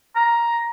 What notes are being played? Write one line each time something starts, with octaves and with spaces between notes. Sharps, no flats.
A#5